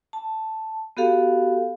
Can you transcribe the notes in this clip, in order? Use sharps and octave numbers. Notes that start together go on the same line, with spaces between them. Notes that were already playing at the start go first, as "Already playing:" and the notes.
A5
B3 F#4 G4 A4 F5